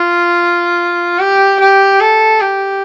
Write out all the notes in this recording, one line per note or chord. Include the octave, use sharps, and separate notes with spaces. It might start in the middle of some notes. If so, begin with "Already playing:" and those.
Already playing: F4
G4
G4
A4
G4